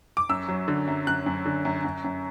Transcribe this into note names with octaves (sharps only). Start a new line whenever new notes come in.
D6
F#2 E6
F#3
D3
F#2
F#2 F#6
F#2
D3
F#2
F#2
F#2